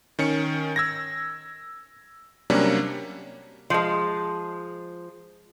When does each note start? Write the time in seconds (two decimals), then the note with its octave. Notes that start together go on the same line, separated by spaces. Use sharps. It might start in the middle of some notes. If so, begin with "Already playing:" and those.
0.19 D#3 C#4 C#7
0.76 E6 G#6 A#6
2.50 C3 F#3 G3 A#3 C#4 D4
3.70 F3 G#3